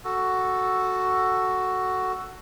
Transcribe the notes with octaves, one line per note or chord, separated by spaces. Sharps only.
F#4 A4